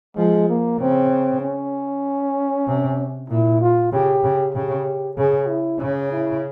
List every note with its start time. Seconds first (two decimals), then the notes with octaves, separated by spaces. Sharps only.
0.16 F3 G#3
0.49 A#3
0.79 C#3 C4
1.41 C#4
2.67 C3
3.30 A#2 E4
3.61 F4
3.92 C#3 G4
4.24 C#3
4.55 C#3 G4
5.17 C#3 G#4
5.48 E4
5.79 C#3 C#4
6.12 E4